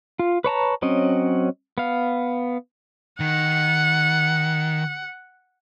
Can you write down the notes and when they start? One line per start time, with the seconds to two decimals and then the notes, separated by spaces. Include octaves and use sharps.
0.19 F4
0.44 B4 C#5 A5 A#5
0.82 F#3 C4 C#4 D#5
1.78 B3 F5
3.20 D#3 F#5